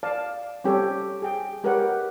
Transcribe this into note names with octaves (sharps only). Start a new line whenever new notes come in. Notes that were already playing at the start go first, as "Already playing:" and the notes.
D5 F5 A5
G3 C4 C#4 G4 A4 C#5
G#4 G5
G#3 G4 A#4 B4 C#5 F#5